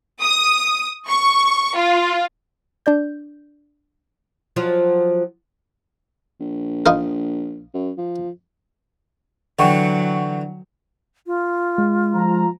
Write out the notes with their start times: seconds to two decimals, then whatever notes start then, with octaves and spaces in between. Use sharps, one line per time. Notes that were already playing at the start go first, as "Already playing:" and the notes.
0.20 D#6
1.08 C#6
1.74 F4
2.86 D4 D5 G6
4.56 F3 F#3 F4
6.40 A#1
6.86 D#4 F4 A#4
7.74 F#2
7.98 F3
9.59 D3 E3 F#3 F#5 G5 C#6
11.27 F4
11.78 G#3
12.14 F3 A#5